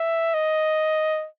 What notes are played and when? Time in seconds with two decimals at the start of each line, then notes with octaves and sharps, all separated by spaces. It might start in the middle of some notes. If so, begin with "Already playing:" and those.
Already playing: E5
0.34 D#5